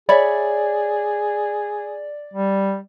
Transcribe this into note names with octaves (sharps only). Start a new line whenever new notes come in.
G#4 C#5 D5 E5 B5
G3